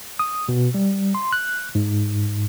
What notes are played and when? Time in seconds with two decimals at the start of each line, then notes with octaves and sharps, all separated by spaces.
0.19 D#6
0.49 B2
0.74 G3
1.15 C6
1.33 F#6
1.75 G#2